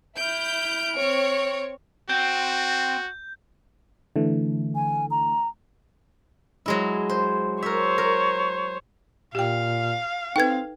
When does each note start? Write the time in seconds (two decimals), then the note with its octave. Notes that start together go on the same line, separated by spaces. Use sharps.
0.17 E4 F6 G6 D7
0.97 C4 C#5
2.09 C4 F#4 G6
4.16 D3 E3 A3
4.75 G#5
5.11 A#5
6.66 F#3 G#3 E4
7.10 C5
7.62 A#4 C5 C#5 E5
7.98 A#4
9.35 A#2 G4 F5 G5
10.36 C4 D#4 A4 B4 G5 G#6